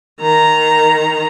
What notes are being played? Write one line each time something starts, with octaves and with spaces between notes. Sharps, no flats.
D#3 A#5